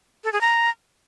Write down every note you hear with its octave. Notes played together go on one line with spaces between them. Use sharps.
A4
G#4
A#5